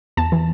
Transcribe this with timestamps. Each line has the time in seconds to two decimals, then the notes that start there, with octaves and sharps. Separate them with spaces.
0.17 E2 A5
0.32 E3